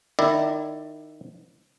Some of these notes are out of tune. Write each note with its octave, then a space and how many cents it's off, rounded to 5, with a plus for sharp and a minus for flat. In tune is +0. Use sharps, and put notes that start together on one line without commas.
D#3 -20 E4 +0 D5 +15